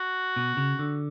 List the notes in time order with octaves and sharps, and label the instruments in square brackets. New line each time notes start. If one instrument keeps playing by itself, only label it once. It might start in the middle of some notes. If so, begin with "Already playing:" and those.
Already playing: [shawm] F#4
[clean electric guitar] B2
C#3
D3